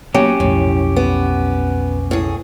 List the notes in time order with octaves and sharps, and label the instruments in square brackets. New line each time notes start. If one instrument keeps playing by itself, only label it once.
[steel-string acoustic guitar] F#3 [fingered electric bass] A#3 B3 [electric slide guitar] C#4 G4
[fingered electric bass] B1 F2 [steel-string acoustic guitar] A2
[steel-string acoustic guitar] B3
A2 G#4